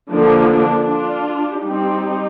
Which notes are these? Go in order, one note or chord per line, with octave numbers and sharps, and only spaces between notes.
D3 F3 A#3 D4
D4
D4 F4
G3 C4 D#4 G4